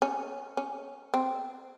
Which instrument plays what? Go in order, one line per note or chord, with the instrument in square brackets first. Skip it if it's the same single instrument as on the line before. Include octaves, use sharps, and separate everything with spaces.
[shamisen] C#4
C#4
C4